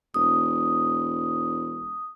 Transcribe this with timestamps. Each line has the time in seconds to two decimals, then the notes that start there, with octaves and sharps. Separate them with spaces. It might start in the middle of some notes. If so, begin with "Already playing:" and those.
0.14 E1 D#6